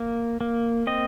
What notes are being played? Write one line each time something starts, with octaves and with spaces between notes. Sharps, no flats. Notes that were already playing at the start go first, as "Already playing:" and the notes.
Already playing: A#3
A#3
C4 D#5